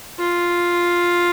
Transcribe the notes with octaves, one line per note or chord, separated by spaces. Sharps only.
F4